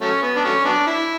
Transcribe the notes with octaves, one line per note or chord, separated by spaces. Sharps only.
F#3 A3 C#4
B3
D4
F#3 A3 C#4
F#3 B3 D4
E4